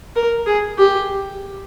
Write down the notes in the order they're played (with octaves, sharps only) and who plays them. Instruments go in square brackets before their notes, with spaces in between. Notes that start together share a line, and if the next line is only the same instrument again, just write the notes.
[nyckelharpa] A#4
G#4
G4